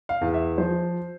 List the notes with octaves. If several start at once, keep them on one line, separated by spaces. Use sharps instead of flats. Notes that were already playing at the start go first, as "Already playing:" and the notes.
F5
E2
E5
F3 C5